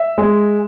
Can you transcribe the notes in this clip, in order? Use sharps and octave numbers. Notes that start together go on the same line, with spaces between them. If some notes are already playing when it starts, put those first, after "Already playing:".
Already playing: E5
G#3